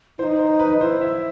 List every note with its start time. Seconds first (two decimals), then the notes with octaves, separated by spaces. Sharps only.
0.18 E4 C5
0.23 D#4
0.39 C5
0.60 B4
0.81 E4 C5
1.01 E5